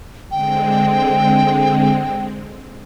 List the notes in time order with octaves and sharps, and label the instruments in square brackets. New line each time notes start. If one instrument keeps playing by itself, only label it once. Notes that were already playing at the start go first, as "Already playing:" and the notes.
[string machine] D3 G#3 C4 [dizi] G5